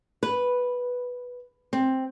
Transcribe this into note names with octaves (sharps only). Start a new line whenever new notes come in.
B4
C4